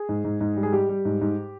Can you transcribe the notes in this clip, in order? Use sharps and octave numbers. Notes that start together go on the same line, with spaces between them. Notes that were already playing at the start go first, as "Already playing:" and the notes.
Already playing: G#4
G#2
G#2
G#2
G3
G#4
G3 G4
G3
G#2
G#2